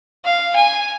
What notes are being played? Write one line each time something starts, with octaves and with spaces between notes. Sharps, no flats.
F5
G#5